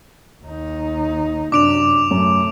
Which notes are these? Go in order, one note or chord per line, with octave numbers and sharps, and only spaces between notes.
D#2 D#4
F#2 C3 D4 D6 D7 F7
F#2 C3 A3